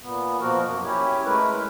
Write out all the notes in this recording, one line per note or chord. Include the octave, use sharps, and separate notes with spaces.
A#2 B3
B2 F3 A#3 F#4 A#4
F#2 A#3
C#4 E4 G4 C#5
G#3 A3 E4 A#4 B4